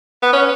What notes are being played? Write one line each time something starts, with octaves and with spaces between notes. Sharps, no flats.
B3
C#4